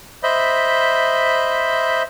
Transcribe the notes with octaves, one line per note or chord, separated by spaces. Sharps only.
C5 D#5 E5 B5